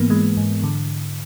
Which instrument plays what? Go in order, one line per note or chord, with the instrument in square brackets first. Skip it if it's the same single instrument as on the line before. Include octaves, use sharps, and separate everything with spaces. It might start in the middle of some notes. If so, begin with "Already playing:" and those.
Already playing: [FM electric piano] G#2 E3 A#3 B3
E3 G#3
G#2
D3